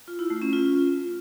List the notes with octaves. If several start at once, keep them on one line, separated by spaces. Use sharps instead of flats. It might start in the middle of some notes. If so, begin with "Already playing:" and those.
F4
E4
A3
C#4
F4